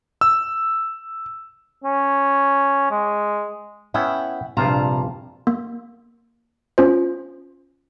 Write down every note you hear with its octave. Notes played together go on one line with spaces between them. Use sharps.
E6
C#4
G#3
B3 C#4 E4 E5 F#5 G5
A#1 G2 C3 F4 A5 A#5
A#3
C#4 F4 C5